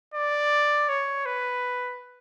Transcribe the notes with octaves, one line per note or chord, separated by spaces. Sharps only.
D5
C#5
B4